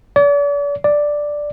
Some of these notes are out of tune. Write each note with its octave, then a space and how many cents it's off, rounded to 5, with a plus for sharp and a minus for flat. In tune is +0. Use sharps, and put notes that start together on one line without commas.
D5 -40
D5 +5